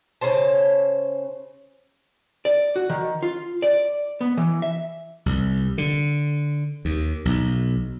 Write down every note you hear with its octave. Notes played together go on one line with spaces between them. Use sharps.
C#3 C#4 C5 A5
D5
F#4
D#3
F4
D5
B3
E3
E5
C2
D3
D#2
B1